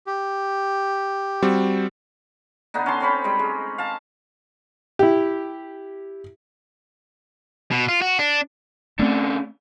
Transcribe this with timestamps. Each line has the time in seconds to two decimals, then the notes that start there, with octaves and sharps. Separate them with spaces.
0.07 G4
1.42 G3 C4 F#4
2.74 D3 B3 D4 D#4
2.86 C#4 A5 C6
3.00 C4 C#4 B5
3.24 G3 G#3
3.39 G#3
3.78 F5 A5
4.99 E4 G4
7.71 B2
7.89 F4
8.02 F#4
8.19 D4
8.99 C#3 A3 C4 D4